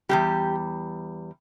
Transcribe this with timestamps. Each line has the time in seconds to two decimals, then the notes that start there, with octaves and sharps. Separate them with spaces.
0.09 E2 C3 G3 G4